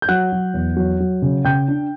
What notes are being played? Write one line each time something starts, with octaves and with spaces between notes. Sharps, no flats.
G6
F#3 F#5 F#6
F#3
E2
F#3
F#3
C#3
C#3 G5 G6
D4